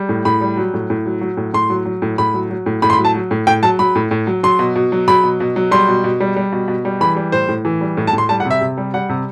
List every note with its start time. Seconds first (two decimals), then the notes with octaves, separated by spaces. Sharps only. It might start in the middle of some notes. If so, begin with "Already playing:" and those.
Already playing: G3
0.09 A2
0.25 A2 B5
0.41 G3
0.57 F#3
0.74 A2
0.90 A2
1.06 F#3
1.21 F#3
1.37 A2
1.53 A2 C6
1.70 F#3
1.85 F#3
2.02 A2
2.18 A2 B5
2.34 F#3
2.50 F#3
2.66 A2
2.82 A2 B5
2.90 C6
2.93 B5
2.98 F#3
3.05 A5
3.15 F#3
3.31 A2
3.47 A2 G5
3.63 F#3 A5
3.79 F#3 B5
3.96 A2
4.11 A2
4.27 F#3
4.43 F#3 C6
4.59 B2
4.76 B2
4.92 F#3
5.08 F#3 B5
5.24 B2
5.40 B2
5.56 F#3
5.71 G3 C6
5.88 B2
6.04 B2
6.20 G3
6.36 G3
6.52 B2
6.68 B2
6.85 G3
7.01 E3 B5
7.16 G3
7.32 A2 C5
7.48 A2
7.65 E3
7.81 G3
7.97 A2
8.07 A5
8.13 A2
8.18 C6
8.29 G3 A5
8.40 F#5
8.45 C3
8.51 E5
8.61 C3
8.77 G3
8.94 G3 F#5
9.09 C3